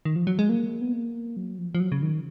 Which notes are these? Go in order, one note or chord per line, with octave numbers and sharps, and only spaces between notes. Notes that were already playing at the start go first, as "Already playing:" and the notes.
D#3
F3
F#3
G#3
A#3
B3
A#3
F#3
F3
F3
F#3
C#3
D#3